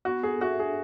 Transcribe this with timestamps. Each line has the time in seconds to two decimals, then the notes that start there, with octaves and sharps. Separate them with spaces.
0.05 B3 F#4
0.23 G#4 A4
0.41 F#4 E5
0.59 D4 G#4